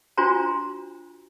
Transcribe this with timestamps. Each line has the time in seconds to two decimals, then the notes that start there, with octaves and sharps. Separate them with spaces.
0.18 D4 F4 F#4 C5 G#5 A#5